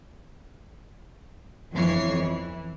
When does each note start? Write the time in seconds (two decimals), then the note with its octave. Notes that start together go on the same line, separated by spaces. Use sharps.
1.74 G1 F2 E3 F3 C#5 C7
2.16 E3